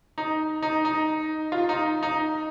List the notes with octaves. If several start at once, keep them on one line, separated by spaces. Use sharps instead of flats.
D#4
D#4
D#4
F4
D#4
D#4